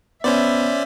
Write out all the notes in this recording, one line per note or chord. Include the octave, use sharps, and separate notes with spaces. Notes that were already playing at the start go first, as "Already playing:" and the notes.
B3 C#4 C5 D5 E5